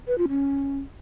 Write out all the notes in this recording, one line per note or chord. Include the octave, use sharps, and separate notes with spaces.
B4
F4
C#4